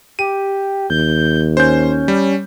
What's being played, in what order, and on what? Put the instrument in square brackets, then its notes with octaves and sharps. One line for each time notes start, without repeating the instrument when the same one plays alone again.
[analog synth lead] G4 [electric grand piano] D#7
[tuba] D#2 [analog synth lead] G6
[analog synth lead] C#4 [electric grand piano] C5 G6
[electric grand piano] G3